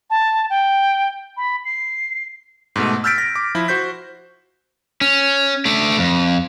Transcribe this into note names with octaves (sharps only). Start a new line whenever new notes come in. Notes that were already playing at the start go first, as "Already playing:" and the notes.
A5
G5
B5
C7
G#2 B2 A3
E6 F6 G6 A6 B6 D7
A#6
D6
F3 E4
F#4 C5 G6 B6
C#4
A3 D4
F2